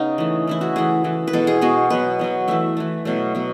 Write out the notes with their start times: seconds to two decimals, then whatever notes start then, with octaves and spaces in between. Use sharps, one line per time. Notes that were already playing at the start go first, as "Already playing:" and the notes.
Already playing: C#3 B3 D#4
0.18 E3 A3
0.47 E3 A3 E4
0.61 F#4
0.76 E3 A3 G#4
1.04 E3 A3
1.28 B4
1.33 B2 G#3 B3 A4
1.47 G#4
1.61 B2 G#3 B3 F#4
1.90 B2 F#3 B3 B4
2.19 B2 F#3 B3
2.48 E3 A3 E5
2.77 E3 A3
3.05 B2 F#3 A3
3.35 B2 F#3